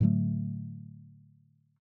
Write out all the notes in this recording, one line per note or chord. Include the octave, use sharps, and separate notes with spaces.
A2 D3 F#3 A3